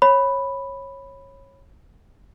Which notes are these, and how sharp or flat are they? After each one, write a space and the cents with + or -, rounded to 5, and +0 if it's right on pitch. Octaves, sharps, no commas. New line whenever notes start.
C#5 -20 B5 +0